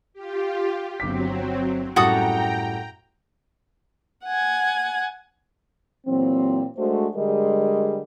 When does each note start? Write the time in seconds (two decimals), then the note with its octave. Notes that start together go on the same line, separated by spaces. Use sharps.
0.13 F4 G4
1.00 G1 F#3 C4 D6 B6
1.96 F#2 A2 G3 F#4 A4 G5 A#5 D#6
4.24 F#5 G#5
6.06 A#2 E3 F#3 C4
6.77 G#3 A3 D4 F#4 C5
7.16 D3 G3 G#3 G#4 A#4 D#5